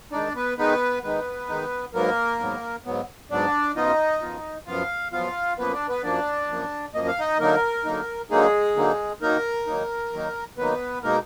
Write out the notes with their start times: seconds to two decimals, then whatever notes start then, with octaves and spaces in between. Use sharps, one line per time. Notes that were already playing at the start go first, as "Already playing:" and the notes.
0.12 D#3 G#3 D4 D#4 D5
0.35 B3 B4
0.58 D#3 G#3 B3 D#4 B4
1.03 D#3 G#3 B3 D#4 B4
1.49 D#3 G#3 D#4
1.94 G#2 F#3 A#3 B3 A#4
2.40 G#2 F#3 B3
2.85 G#2 F#3 B3
3.31 G#2 F#3 B3 D4 D5
3.76 F#2 F3 B3 D#4 F4 D#5
4.22 F#2 F3 B3 F4
4.67 F#2 F3 B3 F4 F5
5.12 F#2 F3 B3 F4 F5
5.58 F#2 F3 A#3 B3 B4
5.73 D4 D5
5.89 B3 B4
6.03 F#2 F3 A#3 D4 D5
6.49 F#2 F3 A#3
6.95 F#2 F3 A#3 D#5
7.07 F5
7.20 D#4 D#5
7.40 D3 F#3 A#3 D#4 A#4
7.85 D3 F#3 A#3 D#4
8.30 D3 F#3 G#3 A#3 D#4 G#4
8.76 D3 F#3 A#3 D#4
9.22 D#3 F#3 A#3 D#4 A#4
9.67 D#3 F#3 A#3 D#4
10.12 D#3 F#3 A#3 D#4
10.58 D#3 F#3 A#3 B3 D#4 B4
11.03 B2 G#3 A#3 D#4 A#4